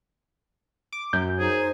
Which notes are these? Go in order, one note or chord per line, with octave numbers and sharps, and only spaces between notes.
D6
F#2 G6
D#4 G#4 C5